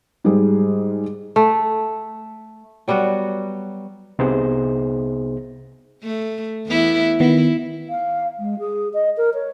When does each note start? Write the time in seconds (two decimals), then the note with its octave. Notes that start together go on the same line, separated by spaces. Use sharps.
0.24 G#2 G3 G#3 G#4
1.36 A3
2.88 F#3 G3 B3 F#4
4.19 C2 C3 B3 D#4 G#4 C5
6.03 A3
6.66 E2 B3 E4
7.20 D#3 B3 E4
7.89 F5
8.39 G#3
8.59 G#4
8.94 D#5
9.17 A#4
9.34 C#5